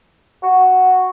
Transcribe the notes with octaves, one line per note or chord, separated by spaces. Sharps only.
F#4